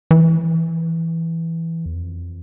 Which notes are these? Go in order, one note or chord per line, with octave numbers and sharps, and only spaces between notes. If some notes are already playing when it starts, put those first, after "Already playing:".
E3
E2
F2